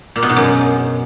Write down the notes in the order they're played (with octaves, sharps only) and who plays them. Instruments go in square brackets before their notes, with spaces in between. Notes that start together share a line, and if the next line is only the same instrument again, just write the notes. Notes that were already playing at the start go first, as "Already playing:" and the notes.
[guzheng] A#2
B2
G#2
F#2